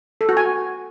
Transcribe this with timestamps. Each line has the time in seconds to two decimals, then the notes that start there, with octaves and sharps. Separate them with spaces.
0.21 A4
0.29 F#4
0.37 G#5